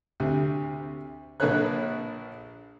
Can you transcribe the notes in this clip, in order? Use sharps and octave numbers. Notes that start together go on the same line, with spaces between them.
D2 C3
A#1 A#3 A4 B4 C#5 F#6